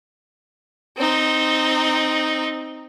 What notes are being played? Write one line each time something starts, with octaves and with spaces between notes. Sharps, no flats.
C4 D#4